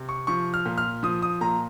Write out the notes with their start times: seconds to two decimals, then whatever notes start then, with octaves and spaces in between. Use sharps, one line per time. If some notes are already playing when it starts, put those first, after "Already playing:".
Already playing: C3
0.09 C#6
0.27 F3 C#6
0.54 F6
0.66 A#2
0.78 F6
1.03 F3 D#6
1.22 D#6
1.41 A#2 A#5